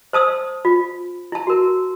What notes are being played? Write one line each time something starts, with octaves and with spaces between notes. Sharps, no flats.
C5 A5 D#6 E6
F4
E4 A5
F#4 A#4